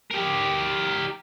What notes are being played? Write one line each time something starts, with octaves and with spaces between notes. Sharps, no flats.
G4 A#4